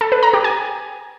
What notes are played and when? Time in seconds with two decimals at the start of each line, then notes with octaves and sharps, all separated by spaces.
0.01 A4
0.12 B4
0.23 A#5
0.33 G4
0.44 G#5